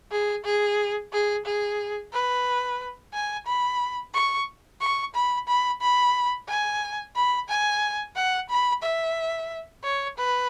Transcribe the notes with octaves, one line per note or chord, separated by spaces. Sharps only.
G#4
G#4
G#4
G#4
B4
G#5
B5
C#6
C#6
B5
B5
B5
G#5
B5
G#5
F#5
B5
E5
C#5
B4